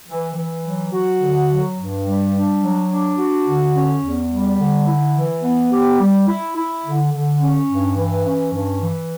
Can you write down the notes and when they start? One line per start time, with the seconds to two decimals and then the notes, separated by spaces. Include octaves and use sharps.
0.07 E3
0.35 E3
0.64 F#3
0.92 F#4
1.20 D3
1.48 F#3
1.78 G2
2.05 G3
2.33 D4
2.61 F#3
2.89 D4
3.18 F#4
3.46 D3
3.75 C#4
4.02 E2
4.31 G3
4.59 D3
4.88 E4
5.15 E3
5.43 B3
5.72 G4
6.00 G3
6.27 E4
6.56 E4
6.85 D3
7.12 D3
7.40 C#4
7.69 G2
7.97 E3
8.26 C#4
8.53 G2
8.82 E3